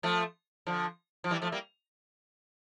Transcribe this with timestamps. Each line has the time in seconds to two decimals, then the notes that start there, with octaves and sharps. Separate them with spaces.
0.03 F3 A3
0.67 D3 F3
1.24 F3
1.31 E3 G3
1.42 F3 A3
1.52 G3 A#3